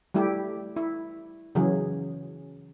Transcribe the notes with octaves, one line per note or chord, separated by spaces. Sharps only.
G3 A3 E4 G4
E4
C#3 E3 F#3 G#4